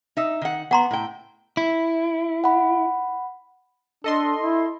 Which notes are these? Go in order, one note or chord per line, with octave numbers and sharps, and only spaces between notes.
D#4 E5
D#3 F#5
B3 F#5 A#5 C6
A2 G5
E4
F#5 B5
D4 A4 D#5 C6
E4